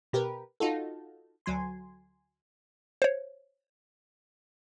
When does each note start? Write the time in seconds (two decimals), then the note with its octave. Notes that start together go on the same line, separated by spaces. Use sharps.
0.13 B2 G4 A#4 B4
0.60 D#4 F4 F#4 A4
1.46 D2 F#3 G#5 C6
3.02 C5 C#5